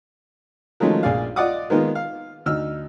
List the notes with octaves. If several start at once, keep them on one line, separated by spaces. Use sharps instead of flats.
D#3 F3 F#3 G#3 A3 C#4
A#1 G#4 D5 F5
F4 D5 D#5 F#5 D6 D#6
D#3 G#3 A#3 B3 F4
F5
D2 D#4 E6 F6